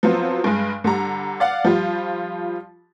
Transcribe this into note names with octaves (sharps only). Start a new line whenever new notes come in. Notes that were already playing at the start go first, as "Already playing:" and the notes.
F3 F#3 B3 C4 F4
G2 G#3
D3 G3 A#5
D5 F5 F#5
F3 G3 F4